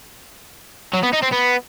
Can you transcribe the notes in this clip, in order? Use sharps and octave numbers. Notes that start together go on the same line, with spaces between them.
F#3
B3
D#4
C4
B3